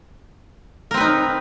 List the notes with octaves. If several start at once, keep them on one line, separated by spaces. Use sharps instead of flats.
C4 D#4 A#4 B4